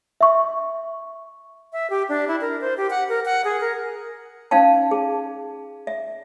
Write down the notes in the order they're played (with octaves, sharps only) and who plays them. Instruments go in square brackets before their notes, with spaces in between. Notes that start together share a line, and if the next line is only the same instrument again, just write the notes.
[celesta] E5 C#6
[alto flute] E5
G4
D4
E4
A#4
C5
G4
F#5
A#4
F#5
G#4
A#4
[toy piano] C#4 D#4 F5 G5 A5
G#4
E5